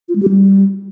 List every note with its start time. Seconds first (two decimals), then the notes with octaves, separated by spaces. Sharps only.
0.09 F4
0.16 G#3
0.23 G4
0.29 G3